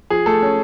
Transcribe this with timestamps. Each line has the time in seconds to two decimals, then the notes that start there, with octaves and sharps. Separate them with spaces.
0.10 F3 G#4
0.26 A3 A4
0.42 C#4